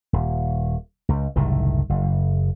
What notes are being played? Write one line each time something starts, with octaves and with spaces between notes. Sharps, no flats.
D#1
C#2
F#1 C2 A2 D#3
F#1